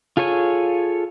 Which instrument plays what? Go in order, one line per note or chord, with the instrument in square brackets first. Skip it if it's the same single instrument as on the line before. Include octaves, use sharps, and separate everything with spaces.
[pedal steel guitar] F4 G#4 A4 C#5 G#5